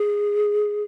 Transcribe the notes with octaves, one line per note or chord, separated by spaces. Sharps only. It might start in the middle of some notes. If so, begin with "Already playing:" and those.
Already playing: G#4